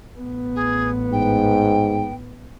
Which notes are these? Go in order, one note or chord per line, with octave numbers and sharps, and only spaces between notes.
A1 B3
G#4
G#2 G5